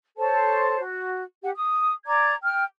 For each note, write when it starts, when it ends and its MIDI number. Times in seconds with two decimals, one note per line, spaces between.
0.17 0.79 69
0.17 0.79 72
0.17 0.79 73
0.17 0.79 81
0.79 1.24 66
1.42 1.50 67
1.42 1.50 78
1.55 1.92 87
2.06 2.33 74
2.06 2.33 82
2.06 2.33 86
2.06 2.33 92
2.43 2.63 79
2.43 2.63 89